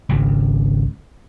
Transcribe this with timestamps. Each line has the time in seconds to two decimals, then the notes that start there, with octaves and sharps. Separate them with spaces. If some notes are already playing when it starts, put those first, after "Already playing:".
0.09 G#1 C#2